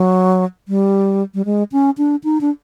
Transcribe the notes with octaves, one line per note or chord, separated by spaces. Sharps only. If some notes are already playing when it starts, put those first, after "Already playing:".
Already playing: F#3
G3
G3
G#3
C#4
D4
D#4
D4